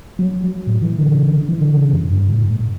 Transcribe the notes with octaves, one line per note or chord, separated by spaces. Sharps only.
F#3
A2
E3
D3
C#3
D3
E3
D3
C#3
F#2
G2
A2
A2